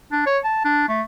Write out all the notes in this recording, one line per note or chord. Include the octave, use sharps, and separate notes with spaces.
D4
C#5
A5
D4
A3